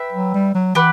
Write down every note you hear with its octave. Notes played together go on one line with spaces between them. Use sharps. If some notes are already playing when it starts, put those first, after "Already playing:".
Already playing: B4 E5 G5
F#3
G3
F#3
E3 G4 B4 F#5